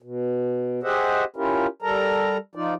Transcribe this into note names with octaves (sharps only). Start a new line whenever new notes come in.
B2
G4 G#4 C5 D#5 E5 F#5
C#4 E4 F4 G4 A#4
G3 A4 A#4 A#5
F3 D#4 F4 D5